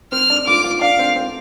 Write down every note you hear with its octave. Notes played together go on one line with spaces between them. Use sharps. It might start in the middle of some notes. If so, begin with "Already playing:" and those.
C4 F6
D4
F4 D6
F4
D4 F5
C4
C4